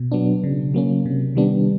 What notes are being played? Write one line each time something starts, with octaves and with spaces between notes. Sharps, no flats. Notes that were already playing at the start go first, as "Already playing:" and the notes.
Already playing: B2
F#3 B3 D4
C#3
F#3 A#3 C#4
C3
D#3 G3 B3 D4